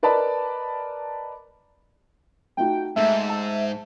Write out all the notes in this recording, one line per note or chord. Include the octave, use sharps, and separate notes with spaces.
A#4 B4 D5 D#5 A5 B5
A3 D#4 F#4 G5
G#2 A3 E5
A5